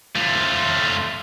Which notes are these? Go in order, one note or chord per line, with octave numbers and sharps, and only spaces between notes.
A3 F4